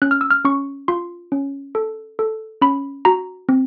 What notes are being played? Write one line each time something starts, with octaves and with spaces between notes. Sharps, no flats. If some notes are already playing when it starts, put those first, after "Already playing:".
C#4 F#6
F6
E6
F6
C#4 C#6
F4 C6
C#4
A4
A4
C#4 B5
F#4 A#5
C4